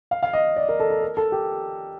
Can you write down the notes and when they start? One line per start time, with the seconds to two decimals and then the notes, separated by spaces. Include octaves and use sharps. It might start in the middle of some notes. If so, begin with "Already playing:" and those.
0.11 F5
0.23 F5
0.33 D#5
0.56 D5
0.69 A#4
0.80 A4
0.90 A4
1.02 A#4
1.17 A4
1.32 G4